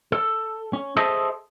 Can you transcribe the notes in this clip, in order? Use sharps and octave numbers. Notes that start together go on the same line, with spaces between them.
A4
C#4
G#4 A4 C5 D#5 E5 A5